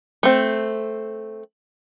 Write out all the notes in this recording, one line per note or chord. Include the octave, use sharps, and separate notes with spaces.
A3 C4